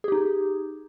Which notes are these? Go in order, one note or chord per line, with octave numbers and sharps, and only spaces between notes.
D#4 G4 G#4